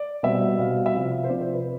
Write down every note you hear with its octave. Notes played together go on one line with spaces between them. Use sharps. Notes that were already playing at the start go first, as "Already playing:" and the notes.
Already playing: D5
B2 G3 C4 E5
B2 G3 C4 F5
E5
C3 F3 C4 F5
C5
C3 F3 C4 D5
C5
B4